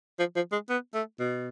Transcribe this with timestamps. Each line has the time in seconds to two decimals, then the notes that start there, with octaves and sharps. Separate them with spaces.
0.19 F3
0.36 F3
0.52 G#3
0.69 B3
0.94 A3
1.19 B2